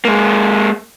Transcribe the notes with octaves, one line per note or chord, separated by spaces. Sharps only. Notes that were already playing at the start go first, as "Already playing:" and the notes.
G#3 A#3